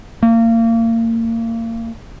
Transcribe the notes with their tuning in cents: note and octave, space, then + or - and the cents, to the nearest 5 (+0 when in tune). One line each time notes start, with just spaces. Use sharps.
A#3 -30